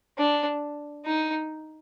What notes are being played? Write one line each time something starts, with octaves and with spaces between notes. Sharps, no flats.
D4
D#4